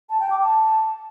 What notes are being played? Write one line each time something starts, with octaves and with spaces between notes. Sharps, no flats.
A5
G5
D6
A5